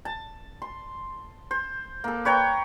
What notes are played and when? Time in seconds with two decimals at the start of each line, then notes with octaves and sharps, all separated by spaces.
0.05 A5
0.62 C6
1.51 C5
2.04 A#3 A4
2.25 B4 C#5 G5 A#5